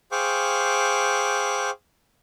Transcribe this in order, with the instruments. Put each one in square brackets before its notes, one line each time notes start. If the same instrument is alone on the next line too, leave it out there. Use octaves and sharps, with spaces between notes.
[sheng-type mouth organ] G#4 C5 F5 G5 C#6 D6